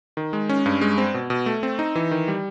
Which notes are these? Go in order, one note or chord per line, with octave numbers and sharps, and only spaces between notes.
D#3
G#3
C#4
G2
G#3
C4
B2
B2
A3
C4
D#4
E3
D#3
G3